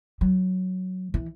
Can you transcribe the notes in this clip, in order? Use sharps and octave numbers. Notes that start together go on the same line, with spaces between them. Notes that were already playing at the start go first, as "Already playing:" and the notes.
F#3
E3